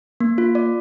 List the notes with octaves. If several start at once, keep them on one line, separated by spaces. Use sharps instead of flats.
A#3
F4
D5